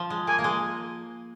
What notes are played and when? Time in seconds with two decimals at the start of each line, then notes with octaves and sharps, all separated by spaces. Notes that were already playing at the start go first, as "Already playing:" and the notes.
Already playing: F3
0.10 G#3
0.27 A#3 G#5
0.38 A#3
0.44 G#3